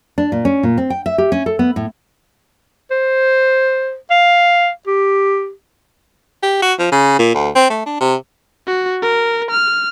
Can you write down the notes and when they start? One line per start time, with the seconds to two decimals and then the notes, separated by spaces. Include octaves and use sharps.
0.18 D4
0.32 A#2
0.45 C#4
0.63 A#2
0.78 C4
0.90 G5
1.06 E5
1.18 G4
1.32 C#4
1.46 A4
1.59 B3
1.76 A2
2.91 C5
4.11 F5
4.87 G4
6.43 G4
6.62 F#4
6.79 F3
6.92 C#3
7.19 A#2
7.35 D2
7.55 C4
7.70 A3
7.86 D4
8.00 C3
8.67 F#4
9.02 A#4
9.51 F6